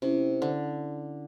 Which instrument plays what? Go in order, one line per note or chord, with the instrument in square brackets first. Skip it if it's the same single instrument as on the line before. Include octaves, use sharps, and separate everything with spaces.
[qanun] C3 [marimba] C#4 E4
[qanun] D3